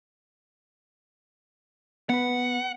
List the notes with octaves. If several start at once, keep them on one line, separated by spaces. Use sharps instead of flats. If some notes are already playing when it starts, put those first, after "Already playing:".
B3 B4 F#5